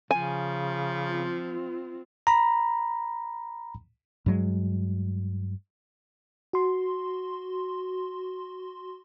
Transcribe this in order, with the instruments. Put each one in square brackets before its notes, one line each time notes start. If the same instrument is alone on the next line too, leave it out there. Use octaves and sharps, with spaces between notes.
[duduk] C#3 [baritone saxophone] F3 [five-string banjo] G#5
[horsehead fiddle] C4 F4
[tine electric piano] A#5 B5
[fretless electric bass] G2 F#3 G#3
[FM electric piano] F#4 C6